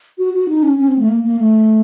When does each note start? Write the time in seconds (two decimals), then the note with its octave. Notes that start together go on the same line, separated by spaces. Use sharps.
0.18 F#4
0.34 F#4
0.48 D#4
0.63 C#4
0.78 C#4
0.88 C4
0.98 A3
1.09 A#3
1.24 A#3
1.39 A3